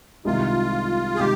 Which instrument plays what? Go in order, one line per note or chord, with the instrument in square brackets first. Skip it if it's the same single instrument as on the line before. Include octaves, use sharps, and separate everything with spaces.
[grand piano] C2 C3 D#3 G#3 D#4 [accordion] F4
[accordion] G#4
[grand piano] C3 D#3 G#3 D#4 [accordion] G4